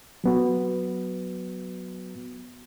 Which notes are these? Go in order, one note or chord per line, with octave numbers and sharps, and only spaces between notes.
F#3 B3 F#4